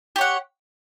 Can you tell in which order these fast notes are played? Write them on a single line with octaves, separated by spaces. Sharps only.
G4 C#5 F#5